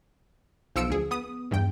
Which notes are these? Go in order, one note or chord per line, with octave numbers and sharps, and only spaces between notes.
B1 F3 F5 E6 C#7 D7
D2 G#4
B3 D#6
E2 G2 G5